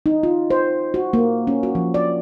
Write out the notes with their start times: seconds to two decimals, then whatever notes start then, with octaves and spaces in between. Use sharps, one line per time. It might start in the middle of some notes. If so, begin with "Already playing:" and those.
0.06 D#4
0.23 F4
0.51 C5
0.94 F#4
1.13 A#3
1.47 C#4
1.63 F#4
1.75 F3
1.94 D5